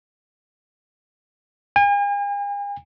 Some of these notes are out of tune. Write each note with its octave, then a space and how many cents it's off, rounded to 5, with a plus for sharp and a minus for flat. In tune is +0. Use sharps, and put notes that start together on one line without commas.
G#5 -45